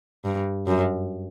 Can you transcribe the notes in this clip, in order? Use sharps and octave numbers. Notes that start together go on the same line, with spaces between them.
G2
F#2